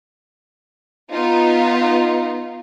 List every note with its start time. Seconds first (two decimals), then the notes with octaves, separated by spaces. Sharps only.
1.11 B3 D#4 F4